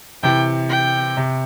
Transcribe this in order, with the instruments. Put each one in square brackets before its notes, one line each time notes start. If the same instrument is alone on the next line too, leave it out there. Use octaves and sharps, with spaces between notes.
[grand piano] C3 E3 [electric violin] G5
[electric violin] G5
[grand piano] C3